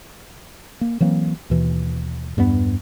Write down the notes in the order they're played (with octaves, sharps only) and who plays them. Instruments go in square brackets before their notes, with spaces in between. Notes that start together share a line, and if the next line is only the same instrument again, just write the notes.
[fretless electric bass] A#3
E3 F#3 A#3 C4
D#2 B2 E3
E2 G2 A3 B3